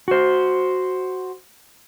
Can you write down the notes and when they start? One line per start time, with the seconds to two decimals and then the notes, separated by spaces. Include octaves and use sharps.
0.08 F#4 C5